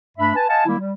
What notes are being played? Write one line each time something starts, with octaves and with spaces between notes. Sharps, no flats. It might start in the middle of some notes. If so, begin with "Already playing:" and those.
G2 A3 D4 E5 B5
B4 G#5 A5
D#5 F5 F#5 G#5 A5
D#3 G3 G#3 A#3 E4
G3